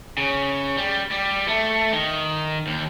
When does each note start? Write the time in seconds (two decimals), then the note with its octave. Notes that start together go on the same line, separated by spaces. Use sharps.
0.18 C#3
0.77 G3
1.11 G3
1.48 A3
1.93 D#3
2.67 D#2